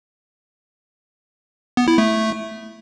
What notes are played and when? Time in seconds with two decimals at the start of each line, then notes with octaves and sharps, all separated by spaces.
1.77 B3
1.88 E4
1.98 A3